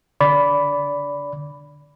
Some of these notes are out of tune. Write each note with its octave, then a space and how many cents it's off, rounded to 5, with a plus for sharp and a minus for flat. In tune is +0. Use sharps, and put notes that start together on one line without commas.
D3 +0 D5 -20 B5 +5